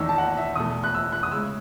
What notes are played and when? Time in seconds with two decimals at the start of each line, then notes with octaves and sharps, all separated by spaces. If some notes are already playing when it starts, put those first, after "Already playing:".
Already playing: E2 D#3 A3 D#4 E6
0.09 A5
0.18 F#5
0.37 E5
0.56 E2 B2 A3 D#6
0.84 F#6
0.94 E6
1.12 F#6
1.23 D#6
1.32 C#3 G#3 C#4 E6